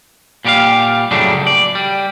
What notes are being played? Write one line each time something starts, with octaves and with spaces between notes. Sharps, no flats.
A#2 G3 G4 A#4 F5
F#2 A2 C#3 G3 A3 D4
D5
G3